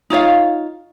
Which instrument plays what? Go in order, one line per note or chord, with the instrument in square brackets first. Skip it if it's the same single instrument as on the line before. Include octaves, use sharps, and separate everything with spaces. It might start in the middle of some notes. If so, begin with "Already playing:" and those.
[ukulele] D#4 F4 C#5 F5